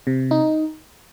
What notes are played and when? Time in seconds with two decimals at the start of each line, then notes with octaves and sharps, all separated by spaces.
0.07 C3
0.31 D#4